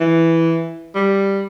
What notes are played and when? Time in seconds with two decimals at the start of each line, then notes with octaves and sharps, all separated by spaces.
0.01 E3
0.95 G3